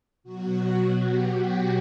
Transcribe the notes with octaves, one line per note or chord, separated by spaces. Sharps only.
B2 F#3 F#4
G4